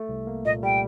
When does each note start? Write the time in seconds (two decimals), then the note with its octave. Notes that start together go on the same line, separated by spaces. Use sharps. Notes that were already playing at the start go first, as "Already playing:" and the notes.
Already playing: A3
0.09 C2
0.27 A#3
0.45 A#2 D#5
0.63 G3 G5